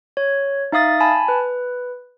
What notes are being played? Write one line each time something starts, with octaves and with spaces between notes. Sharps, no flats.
C#5
D#4 E5 F5 D#6 A6
G#5 A5 B5
B4